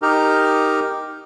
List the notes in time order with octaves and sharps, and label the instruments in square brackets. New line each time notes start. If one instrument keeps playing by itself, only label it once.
[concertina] D#4 G4 A#4